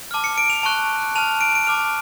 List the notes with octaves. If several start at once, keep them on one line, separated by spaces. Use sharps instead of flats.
A5 D6 F6
C#7
D7
F7
A5 C#6 F#6
A5 F6 F7
D7
D7
A5 D6 F6 F7